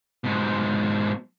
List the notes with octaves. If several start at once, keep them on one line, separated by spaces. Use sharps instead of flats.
G#2 B2